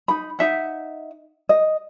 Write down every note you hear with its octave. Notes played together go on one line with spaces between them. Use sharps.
D#4 B5
D#4 E5 F#5
D#5